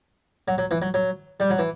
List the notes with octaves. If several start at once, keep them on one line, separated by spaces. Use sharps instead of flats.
F#3
F#3
E3
F#3
F#3
G3
F#3
E3